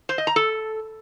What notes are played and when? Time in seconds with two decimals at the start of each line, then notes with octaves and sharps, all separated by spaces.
0.09 C5
0.18 D#5
0.27 A#5
0.36 A4